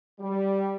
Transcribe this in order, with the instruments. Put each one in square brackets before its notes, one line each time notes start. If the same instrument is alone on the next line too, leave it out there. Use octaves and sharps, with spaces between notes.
[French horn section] G3